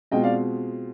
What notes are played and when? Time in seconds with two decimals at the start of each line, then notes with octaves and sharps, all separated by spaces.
0.11 B2 G#3 C4 F4 D#5 G5
0.23 D5 F5